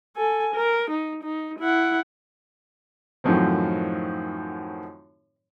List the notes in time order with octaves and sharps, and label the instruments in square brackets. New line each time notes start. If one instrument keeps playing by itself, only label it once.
[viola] A4 G#5
A#4
D#4
D#4
E4 F#5
[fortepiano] F#2 A2 D#3 F3 F#3 C4